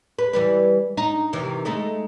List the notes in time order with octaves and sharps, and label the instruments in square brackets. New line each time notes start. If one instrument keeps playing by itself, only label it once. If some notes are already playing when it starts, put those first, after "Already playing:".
[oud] B4
E3 G3 B4
D#4
C3 D#3 E3
G#3 A3 D#4